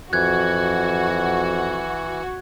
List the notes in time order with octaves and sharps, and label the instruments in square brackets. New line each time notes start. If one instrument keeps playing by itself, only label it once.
[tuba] F2 [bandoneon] E3 [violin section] F#4 [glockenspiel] F#6 G#6